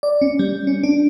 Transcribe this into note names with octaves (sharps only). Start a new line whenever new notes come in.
D5
C#4
G3
C#4
D4